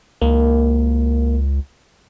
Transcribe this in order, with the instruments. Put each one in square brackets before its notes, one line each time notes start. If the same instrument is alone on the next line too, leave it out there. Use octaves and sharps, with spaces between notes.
[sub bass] C#2 [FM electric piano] A#3